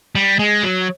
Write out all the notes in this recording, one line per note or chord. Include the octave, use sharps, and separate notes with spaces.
G3
G#3
F#3